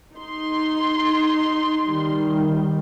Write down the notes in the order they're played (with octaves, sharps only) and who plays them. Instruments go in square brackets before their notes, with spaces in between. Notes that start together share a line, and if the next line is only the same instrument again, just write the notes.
[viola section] D#4 C6
[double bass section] D#3 G3